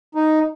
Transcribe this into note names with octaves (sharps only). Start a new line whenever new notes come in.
D#4